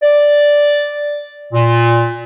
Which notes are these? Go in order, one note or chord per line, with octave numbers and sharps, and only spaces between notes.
D5
A#2